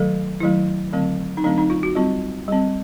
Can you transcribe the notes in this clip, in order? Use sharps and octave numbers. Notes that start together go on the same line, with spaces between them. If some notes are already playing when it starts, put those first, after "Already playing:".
Already playing: D#3 F#3 A3 A4
D#3 F#3 A3 E4
D3 F#3 A3 C4
D#4
D3 F#3 A3 C4 D4
D#4
F4
F#4
G3 C4 F4
G3 C4